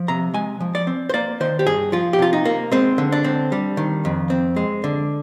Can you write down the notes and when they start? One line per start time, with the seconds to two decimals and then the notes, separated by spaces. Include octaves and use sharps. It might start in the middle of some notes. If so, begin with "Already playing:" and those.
Already playing: F3
0.08 C3 A#5
0.34 G#3 G#5
0.60 F3
0.75 D5
0.87 C4
1.09 C5
1.14 A#3 D5
1.40 D#3 C5
1.59 G4
1.67 G2 G#4
1.92 F3 F4
2.13 G4
2.19 C3 F4
2.33 D#4
2.45 A#3
2.72 G#3 C4
2.98 D3
3.12 D4
3.24 C4
3.52 G3
3.77 D#3
4.05 F2
4.30 C4
4.56 G#3
4.84 D3